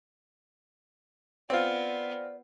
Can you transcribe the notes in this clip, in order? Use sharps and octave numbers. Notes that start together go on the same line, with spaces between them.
B3 C4 F4 D5